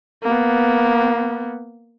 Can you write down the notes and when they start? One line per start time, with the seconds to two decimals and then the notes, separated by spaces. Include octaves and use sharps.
0.23 A#3 B3